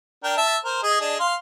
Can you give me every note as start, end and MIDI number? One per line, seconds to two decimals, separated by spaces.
0.24 0.37 62
0.24 0.37 70
0.24 0.37 79
0.37 0.57 76
0.37 0.57 81
0.65 0.83 70
0.65 0.83 72
0.83 0.99 68
0.83 0.99 75
1.01 1.15 62
1.01 1.15 68
1.01 1.15 75
1.19 1.34 77
1.19 1.34 84